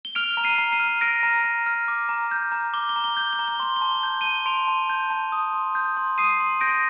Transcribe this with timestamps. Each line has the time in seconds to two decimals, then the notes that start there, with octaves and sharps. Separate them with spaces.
0.05 G7
0.15 F6 D7 F7
0.37 A#5
0.44 C7 D#7
0.58 A#5
0.72 C7 D#7
0.80 F6
1.01 F6 A#6 D7
1.23 A#5
1.44 A#5
1.66 F6
1.88 D6
2.09 A#5
2.31 G6
2.52 A#5
2.74 D6 G7
2.89 G7
2.96 A#5
3.04 G7
3.17 G6 G7
3.33 G7
3.39 A#5
3.48 G7
3.60 C6 G7
3.76 G7
3.81 A5
3.92 G7
4.03 G6 G7
4.21 A5 D#7 G7
4.46 C6 D7 F7
4.68 A5
4.90 G6
5.10 A5
5.32 D#6
5.53 C6
5.75 G6
5.97 C6
6.18 D#6 C7 D#7
6.40 C6
6.61 G6 A#6 D7